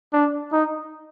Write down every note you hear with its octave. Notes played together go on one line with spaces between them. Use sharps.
D4
D#4